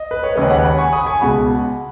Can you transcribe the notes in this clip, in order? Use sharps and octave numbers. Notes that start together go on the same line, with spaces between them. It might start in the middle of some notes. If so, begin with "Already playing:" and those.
Already playing: D#5
B4
C#5
D#2 C#3 G#3 B4 D#5
C#5 F#5
F#5 B5
G#5 C#6
B5 D#6
G#5 C#6
C#2 B2 G#3 F#5 B5